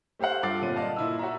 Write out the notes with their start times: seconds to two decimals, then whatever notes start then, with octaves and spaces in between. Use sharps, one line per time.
0.19 A3 G4 C5 F5 F#5
0.43 G2 F4 A4 D6 A6 C7
0.61 G1 A#2 C4 D#7
0.76 D5 D#5 F5 A5
0.96 A#2 E4 E6
1.19 F#4 E5 A#5